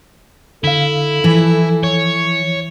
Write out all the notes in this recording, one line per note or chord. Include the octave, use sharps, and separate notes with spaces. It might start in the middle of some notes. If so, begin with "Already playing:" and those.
D3 E4 A4 F5
E3 F3
C#5